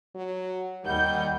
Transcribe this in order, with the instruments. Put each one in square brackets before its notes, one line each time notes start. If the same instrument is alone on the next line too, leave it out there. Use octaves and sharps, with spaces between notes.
[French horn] F#3
[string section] D#2 G3 G6 [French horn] D#3 [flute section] F#5 G5 B5